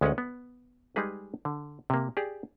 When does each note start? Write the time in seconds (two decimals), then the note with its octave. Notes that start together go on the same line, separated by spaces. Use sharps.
0.01 D2 G#3 C#4 A#4 D#5 F#5
0.18 B3
0.96 G3 G#3 D#4 G#4 B4
1.45 D3
1.90 C3 A#3
2.17 G4 G#4 D5